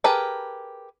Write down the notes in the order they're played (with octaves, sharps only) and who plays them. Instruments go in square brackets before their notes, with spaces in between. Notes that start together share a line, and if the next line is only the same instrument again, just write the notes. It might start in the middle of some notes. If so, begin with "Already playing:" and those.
[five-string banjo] G4 G#4 A#4 B4 A5